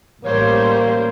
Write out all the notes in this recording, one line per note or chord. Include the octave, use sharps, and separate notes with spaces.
A1 G3 A#3 C5 C#5